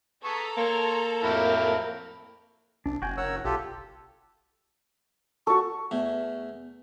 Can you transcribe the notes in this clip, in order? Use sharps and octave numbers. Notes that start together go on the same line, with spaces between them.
B3 G#4 A4 A#5 C#6
A#3 C#5 C6
F2 A2 F#3 E4 G4 A#4
C2 D4
F#1 F#4 G5 G#5
A#4 C#5 F#5 E6
B1 F4 G4 A4 E5
F#4 A4 C#6
E2 A3